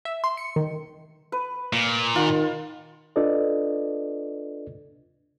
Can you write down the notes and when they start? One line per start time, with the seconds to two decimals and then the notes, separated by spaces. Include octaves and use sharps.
0.05 E5
0.24 C6
0.37 C#7
0.56 D#3
1.32 B4
1.73 A#2
2.16 D#3 F4
3.16 D4 F4 A4 B4 D5 D#5